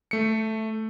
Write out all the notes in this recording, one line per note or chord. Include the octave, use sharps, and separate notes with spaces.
A3 C#7